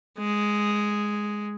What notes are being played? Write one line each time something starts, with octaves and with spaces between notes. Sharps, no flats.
G#3